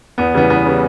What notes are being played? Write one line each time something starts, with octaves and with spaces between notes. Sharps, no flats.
E2 B3
C#3 E3 G3 B3
E2 B3
C#3 E3 G3